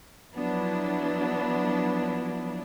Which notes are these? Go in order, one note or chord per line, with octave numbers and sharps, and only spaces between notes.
F3 F#3 B3 D4 E4